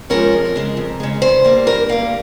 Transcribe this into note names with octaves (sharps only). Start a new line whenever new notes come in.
F3 G#3 C#4 A#4
F2
C#3 G#3
F2
C#3 G#3
G2 C5
G3 A#3
G2 A#4
G3 A#3 F5